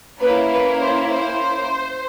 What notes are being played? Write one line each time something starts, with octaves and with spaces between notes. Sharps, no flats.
A#3 C#4 E4 B4
B4
C5
C5